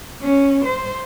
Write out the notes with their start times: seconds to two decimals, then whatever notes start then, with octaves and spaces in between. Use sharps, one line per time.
0.22 C#4
0.65 C5